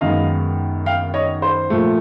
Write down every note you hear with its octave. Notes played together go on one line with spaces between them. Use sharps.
F#2 D#3 G#3 B3 D#5 F5
F5 G5
C#5 D#5
C5
A#2 F3 A3